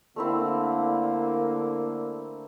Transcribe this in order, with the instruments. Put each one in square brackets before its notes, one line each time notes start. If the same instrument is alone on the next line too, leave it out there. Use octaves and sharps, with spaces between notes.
[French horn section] D3 A#3 [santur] A3 C4 E4